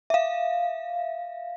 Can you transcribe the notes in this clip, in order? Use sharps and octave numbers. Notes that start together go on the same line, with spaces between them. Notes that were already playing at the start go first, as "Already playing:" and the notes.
E5 F5